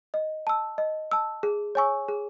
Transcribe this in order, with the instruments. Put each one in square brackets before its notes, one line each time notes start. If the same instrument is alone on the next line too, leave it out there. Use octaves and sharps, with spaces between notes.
[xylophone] D#5
A5 E6
D#5
A5 E6
G#4
C#5 G#5 C#6 E6
G#4